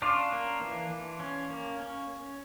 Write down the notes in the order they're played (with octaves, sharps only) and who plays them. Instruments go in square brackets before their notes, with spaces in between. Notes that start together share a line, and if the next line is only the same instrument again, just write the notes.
[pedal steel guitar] C#4 D4 F4
A#3
E3
E3
C#4
A#3
C#4